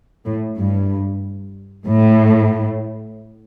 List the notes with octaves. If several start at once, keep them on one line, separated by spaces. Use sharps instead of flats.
A2
G2
A2